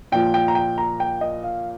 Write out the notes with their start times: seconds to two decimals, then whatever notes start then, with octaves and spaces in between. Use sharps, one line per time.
0.12 A#2 F3 G5
0.34 G5
0.48 A#5
0.55 G5
0.78 A#5
1.00 G5
1.21 D#5
1.44 F5